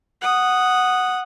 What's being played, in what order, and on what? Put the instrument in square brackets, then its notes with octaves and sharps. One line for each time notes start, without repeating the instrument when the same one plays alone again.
[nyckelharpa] F#5 D#6